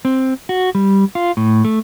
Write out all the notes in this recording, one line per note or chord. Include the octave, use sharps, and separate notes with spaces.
C4
F#4
G3
F4
A2
A3